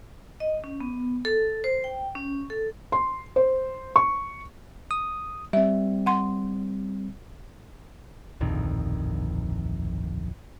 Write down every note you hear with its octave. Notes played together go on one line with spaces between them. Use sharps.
D#5
C#4
B3
A4
C5
G5
C#4
A4
C6
C5
C#6
D#6
G3 C4 E5
F#5 C6
D1 A#1 F2 D#3